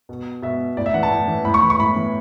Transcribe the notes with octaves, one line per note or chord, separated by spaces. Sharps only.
B2
B2 E5
A2 D5
E5
E3 F#5
A5
A2
E3
A2 B5
C#6
E3 B5
C#6
A2 B5
E3